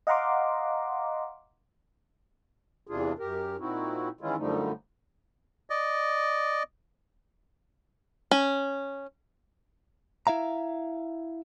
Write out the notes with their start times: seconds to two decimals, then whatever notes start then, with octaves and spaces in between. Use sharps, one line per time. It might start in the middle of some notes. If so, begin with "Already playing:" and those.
0.07 D#5 F5 F#5 A#5 C6 D6
2.87 E2 C3 E3 D4 F4 G#4
3.19 F#2 G4 A#4
3.60 A#2 C4 D#4 E4 F#4
4.21 D#3 E3 G#3 C#4 E4 F4
4.37 F#2 D3 F3 G3 A3 D#4
5.70 D5 D#5
8.31 C#4
10.27 E4 E5 F5 A#5